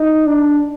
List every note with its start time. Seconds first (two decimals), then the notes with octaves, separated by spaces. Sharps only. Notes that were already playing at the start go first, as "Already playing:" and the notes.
Already playing: D#4
0.27 D4